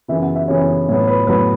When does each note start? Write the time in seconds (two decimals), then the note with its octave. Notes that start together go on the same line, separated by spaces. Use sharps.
0.08 F#2 C#3 E3 B3 E5
0.22 F#5
0.35 E5
0.48 F#2 C#3 E3 B3 C#5
0.89 A2 F#3 B3 C#5
1.07 B4
1.27 A2 F#3 B3 B4